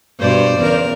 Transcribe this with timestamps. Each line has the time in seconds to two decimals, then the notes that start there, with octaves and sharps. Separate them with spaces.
0.20 G2 B2 C5 D5
0.57 E2 C#3 A#4